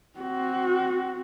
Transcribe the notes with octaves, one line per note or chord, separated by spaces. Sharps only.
C4 F#4